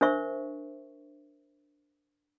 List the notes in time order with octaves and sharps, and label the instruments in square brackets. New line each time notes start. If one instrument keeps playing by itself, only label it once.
[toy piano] D4 A#4 C5 E5 C#6